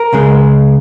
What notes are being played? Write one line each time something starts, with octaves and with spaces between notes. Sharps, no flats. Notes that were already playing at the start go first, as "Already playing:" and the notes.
Already playing: A#4
C#2 C#3 G#3